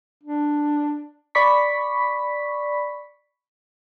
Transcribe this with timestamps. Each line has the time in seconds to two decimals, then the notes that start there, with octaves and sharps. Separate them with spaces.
0.23 D4
1.35 D5 B5 C#6 B6